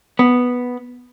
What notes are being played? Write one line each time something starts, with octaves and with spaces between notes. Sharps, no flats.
B3